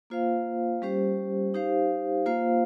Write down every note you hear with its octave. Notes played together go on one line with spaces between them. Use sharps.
A#3 F4 C5 F5
G3 C#4 G4 C5
D#4 G4 C5 F5
A#3 F4 C5 F5